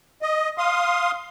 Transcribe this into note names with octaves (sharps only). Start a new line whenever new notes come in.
D#5
F5 C6 D#6